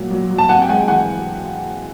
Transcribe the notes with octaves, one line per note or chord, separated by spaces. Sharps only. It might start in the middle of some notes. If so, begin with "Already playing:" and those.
Already playing: A#2 F#3 G3
F#3
F#3
A5
C3 F#5 G#5
G5
G#3 F#5 G#5
E3 F#5 G#5